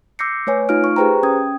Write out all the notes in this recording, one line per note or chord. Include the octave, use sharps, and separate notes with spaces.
D6 E6 G6 A#6 C7 C#7
A3 B4 C#5 G#5
A3 D#4 F4 F5 F6 D7
C#6
G4 G#4 B4 C5 G5 A#5
C#4 G5 D#6 G#6